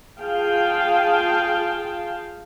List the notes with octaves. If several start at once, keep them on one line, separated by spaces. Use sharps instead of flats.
F4 G#4 F5 G5 A5